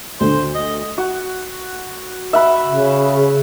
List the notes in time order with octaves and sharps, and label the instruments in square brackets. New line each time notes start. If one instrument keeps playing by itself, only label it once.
[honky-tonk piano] D2 D3 [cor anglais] C5
[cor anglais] D#5
[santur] F#4
E5 F#5 B5
[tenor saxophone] C#3